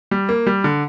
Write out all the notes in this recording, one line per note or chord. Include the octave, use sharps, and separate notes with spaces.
G3
A#3
G3
D3